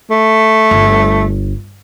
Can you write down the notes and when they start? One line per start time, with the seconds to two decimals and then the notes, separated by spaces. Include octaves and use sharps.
0.10 A3
0.71 G1